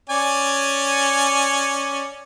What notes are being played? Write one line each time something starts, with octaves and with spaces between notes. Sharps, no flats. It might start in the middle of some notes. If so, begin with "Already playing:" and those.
C#4 D5 G#5